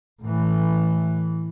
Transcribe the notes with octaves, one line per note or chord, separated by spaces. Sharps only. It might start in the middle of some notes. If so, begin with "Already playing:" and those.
A2 E3